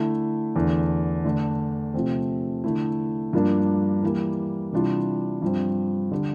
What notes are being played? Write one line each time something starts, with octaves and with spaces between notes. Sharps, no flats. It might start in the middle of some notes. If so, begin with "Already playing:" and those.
Already playing: D3 A3 E4
E2 D3 A3
D3 A3 D4
C3 F3 A3 C4
D3 A3 E4
G2 F3 A#3 D4
E3 G3 A#3
C3 E3 G3 D4 F4
G2 F3 C4
D3 G3